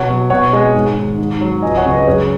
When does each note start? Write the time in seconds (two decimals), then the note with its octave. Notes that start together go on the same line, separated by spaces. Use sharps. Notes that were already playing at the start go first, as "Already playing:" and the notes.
Already playing: B2 C#5 F#5
0.09 F#3
0.30 B2 C#5 F#5
0.53 G#3 D#5 G#5
0.74 G#2
0.96 D#3
1.18 G#2
1.41 F#3
1.62 C#2 D#5 G#5
1.77 C#5 F#5
1.85 C#3
1.92 B4 D#5
2.06 F#2 G#4 C#5